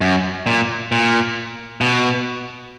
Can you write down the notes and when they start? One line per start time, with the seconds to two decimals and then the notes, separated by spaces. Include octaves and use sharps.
0.01 F#2
0.46 A#2
0.92 A#2
1.81 B2